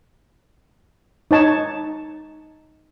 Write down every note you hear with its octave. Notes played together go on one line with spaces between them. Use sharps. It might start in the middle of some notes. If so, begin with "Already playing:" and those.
D#4 C#5 A5